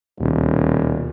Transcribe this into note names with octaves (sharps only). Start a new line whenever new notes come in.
D#1 D2 B2 D#3